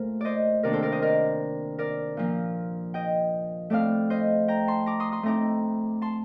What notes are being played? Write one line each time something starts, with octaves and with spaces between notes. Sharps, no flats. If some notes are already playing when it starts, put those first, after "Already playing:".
Already playing: A#2 A3 A#4 C5
C5 D5 D#5
C3 D#3 A#3 D4 A#4 D5
A4 C5
A#4 D5
C5 D#5
A#4 D5
A#4 D5
A#2 F3 A#3
D#5 G5
A2 A3 C4 D5 F5
C5 D#5
G5 A#5
A5 C6
A#5 D6
C6 D#6
C6 D#6
A2 A3 C4 D#4 A#5 D6
A5 C6